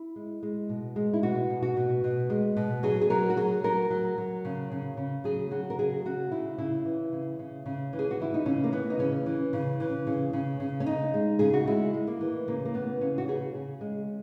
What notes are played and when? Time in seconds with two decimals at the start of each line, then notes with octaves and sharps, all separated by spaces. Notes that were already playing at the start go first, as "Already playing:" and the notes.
Already playing: E4
0.16 G#3
0.43 G#3
0.69 B2
0.96 G#3
1.13 E4
1.23 B2 F#4
1.50 B2
1.62 F#4
1.77 B2
2.04 B2
2.30 G#3
2.57 B2
2.83 F#3 G#4
3.01 G#4
3.10 F#3 A#4
3.30 F#4
3.37 F#3 G#4
3.64 F#3 A#4
3.90 F#3
4.18 F#3
4.45 C#3
4.72 C#3
4.97 C#3
5.24 F#3 G#4
5.51 F#3 F#4
5.70 A#4
5.79 C#3 G#4
6.05 C#3 F#4
6.31 C#3 E4
6.58 C#3 E4
6.85 E3
7.12 C#3
7.39 C#3
7.66 C#3
7.93 E3
7.99 G#4
8.11 F#4
8.20 E3 E4
8.34 D#4
8.46 C#3 C#4
8.64 A#3
8.72 E3 B3
8.90 D#4
8.99 C#3 C#4
9.26 E3
9.53 C#3
9.80 E3
10.07 C#3
10.33 C#3
10.60 C#3
10.80 C#4
10.86 C#3 D#4
11.14 G#3
11.39 C#3 G#4
11.53 F#4
11.67 G#3 E4
11.94 G#3
12.07 A#3
12.21 E3
12.48 C#3 A#3
12.65 A#3
12.74 E3 B3
13.01 C#3 C#4
13.18 F#4
13.28 C#3 G#4
13.55 C#3
13.81 G#3